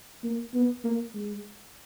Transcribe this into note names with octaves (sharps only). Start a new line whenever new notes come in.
A#3
B3
A#3
G#3